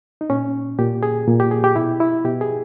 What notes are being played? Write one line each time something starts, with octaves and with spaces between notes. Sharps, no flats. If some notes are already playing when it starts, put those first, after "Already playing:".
D#4
A#2 C#4
A#2 G4
G#4
A#2
G4
G#4
G4
B2 E4
E4
B2 G4
G#4